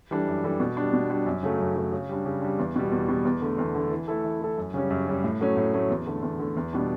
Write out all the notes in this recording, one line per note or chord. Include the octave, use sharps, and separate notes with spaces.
E3 G3 D4 A4
F#2
E3 G3 D4 A4
B2
G3 D4
B2
G3 D4
F#2
C#3 F#3 A3
F#2
C#3 F#3 A3
C#3
G3 D4
C#3
G3 D4
E2
B2 G3
E2
B2 G3
E2
D3 A3
E2
D3 A3
E3
A3 E4 A4
E3
A3 E4 A4
F#2
C#3 G3 C#4
F#2
C#3 G3 C#4
A2
F#3 A3 C#4
A2
F#3 A3 C#4
E2
D3 A3
E2
D3 A3
E2
B2 G3 D4